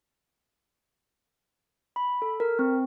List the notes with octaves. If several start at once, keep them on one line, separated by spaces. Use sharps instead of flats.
B5
A4
A#4
C4